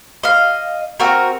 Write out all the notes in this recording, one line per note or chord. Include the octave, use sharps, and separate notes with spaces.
D#5 F5
C4 F#4 A#4